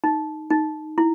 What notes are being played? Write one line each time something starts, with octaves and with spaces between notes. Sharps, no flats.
D#4
D#4
E4